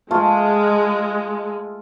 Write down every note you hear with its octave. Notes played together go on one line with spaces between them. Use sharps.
G#3 A3 F4